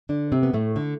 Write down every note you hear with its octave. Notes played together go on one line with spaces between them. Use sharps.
D3 D4
C3 C4
B3
A2 A3
D3